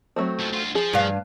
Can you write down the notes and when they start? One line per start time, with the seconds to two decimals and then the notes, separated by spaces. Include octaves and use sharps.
0.16 F#3 A3 C4
0.40 D#2 F3
0.53 D2 F4
0.75 F3 G#4
0.93 G2 F5